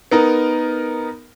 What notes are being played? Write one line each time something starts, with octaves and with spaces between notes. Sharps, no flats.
B3 D#4 A#4